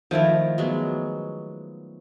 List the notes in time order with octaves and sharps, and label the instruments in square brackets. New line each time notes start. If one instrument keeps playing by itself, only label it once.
[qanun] D#3 A#4 [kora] F3 A3 E4
[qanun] F#3 G#3 B3